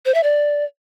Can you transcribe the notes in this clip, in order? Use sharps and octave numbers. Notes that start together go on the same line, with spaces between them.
C5
E5
D5